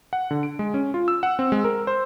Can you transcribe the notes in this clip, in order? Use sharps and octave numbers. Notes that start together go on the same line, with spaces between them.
F#5
D3
D7
G#3
C#4
F4
E6
F#5
C4
G#3
A#4
C5